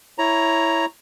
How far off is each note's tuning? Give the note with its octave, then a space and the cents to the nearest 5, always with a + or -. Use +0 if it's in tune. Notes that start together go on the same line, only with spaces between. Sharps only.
E4 +0 C#5 +0 A#5 +5